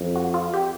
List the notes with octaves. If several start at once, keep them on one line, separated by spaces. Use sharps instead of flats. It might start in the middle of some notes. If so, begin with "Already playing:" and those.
Already playing: F2
F#4
F4
G4